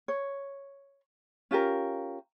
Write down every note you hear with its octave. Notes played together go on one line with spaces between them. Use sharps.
C#5
C#4 F4 G4 A#4